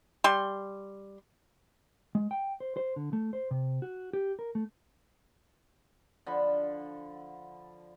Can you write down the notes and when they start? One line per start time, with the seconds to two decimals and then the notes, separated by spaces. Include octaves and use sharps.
0.24 G3 C6
2.15 G#3
2.31 G5
2.60 C5
2.77 C5
2.96 D3
3.13 A3
3.33 C5
3.51 C3
3.82 F#4
4.13 G4
4.39 A#4
4.55 A3
6.26 D3 F3 B5